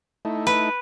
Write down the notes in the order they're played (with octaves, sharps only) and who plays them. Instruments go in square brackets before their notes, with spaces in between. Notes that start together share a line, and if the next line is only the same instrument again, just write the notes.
[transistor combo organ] A3 D#4 E4
[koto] B4